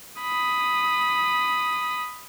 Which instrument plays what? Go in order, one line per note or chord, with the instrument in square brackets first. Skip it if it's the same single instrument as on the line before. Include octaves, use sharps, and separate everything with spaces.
[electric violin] B5 D#6